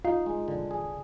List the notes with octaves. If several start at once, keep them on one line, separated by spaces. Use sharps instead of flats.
D#4 F4
G#3
D3
G#4